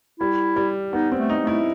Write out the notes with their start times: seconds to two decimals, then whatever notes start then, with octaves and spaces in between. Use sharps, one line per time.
0.20 G3 E4
0.56 G3
0.93 B3 D#4
1.12 C4
1.17 A3
1.29 D#4
1.42 A3
1.47 E4